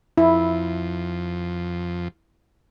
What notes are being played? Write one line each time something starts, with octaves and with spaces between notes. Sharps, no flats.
F2 E4